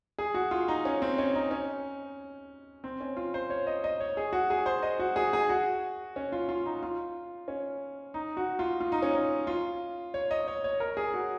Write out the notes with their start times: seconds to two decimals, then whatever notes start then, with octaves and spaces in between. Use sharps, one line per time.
0.19 G#4
0.34 F#4
0.51 F4
0.68 D#4
0.85 C#4
1.02 C4
1.18 C#4
1.35 D#4
1.51 C#4
2.84 C4
3.01 C#4
3.17 F4
3.34 C5
3.50 C#5
3.67 D#5
3.84 D#5
4.00 C#5
4.17 G#4
4.33 F#4
4.50 G#4
4.66 C5
4.83 D#5
4.99 F#4
5.16 G#4
5.33 G#4
5.49 F#4
6.16 C#4
6.32 F4
6.49 F4
6.66 D#4
6.83 F4
7.48 C#4
8.14 D#4
8.37 F#4
8.59 F4
8.81 F4
8.92 D#4
9.02 C#4
9.13 D#4
9.47 F4
10.14 C#5
10.31 D#5
10.48 C#5
10.64 C#5
10.80 A#4
10.97 G#4
11.14 F#4